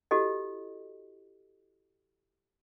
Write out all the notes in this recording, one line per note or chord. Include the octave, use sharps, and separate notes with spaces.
E4 F#4 G4 A4 D#5